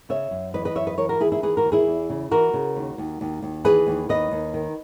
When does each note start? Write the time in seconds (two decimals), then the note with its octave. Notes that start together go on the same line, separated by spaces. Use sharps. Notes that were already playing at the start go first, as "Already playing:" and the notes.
0.09 C#3 C#5 E5
0.31 F#2
0.54 E3 B4 D#5
0.65 B4 D#5
0.76 F#2 C#5 E5
0.87 B4 D#5
0.98 E3 A#4 C#5
1.09 F#4 A#4
1.20 D#2 E4 G#4
1.32 E4 G#4
1.42 E3 G#4 B4
1.57 F#4 A#4
1.65 D#2
1.72 E4 G#4
1.87 E2
2.09 C#3
2.31 E3 F#4 A#4
2.53 C#3
2.76 D#2
2.98 D#2
3.21 D#2
3.42 D#2
3.64 E3 G#4 B4
3.87 D#2
4.09 D#2 B4 D#5
4.31 D#2
4.54 D#3